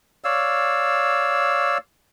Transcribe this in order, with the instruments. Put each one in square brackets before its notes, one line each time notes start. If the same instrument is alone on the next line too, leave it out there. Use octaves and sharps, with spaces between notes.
[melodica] C#5 D5 F5 E6